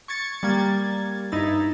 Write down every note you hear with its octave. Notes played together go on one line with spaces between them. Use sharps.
C#6 G#6 A6 C#7
G3 A#3 G#6 A6
G2 D#4 E4 A6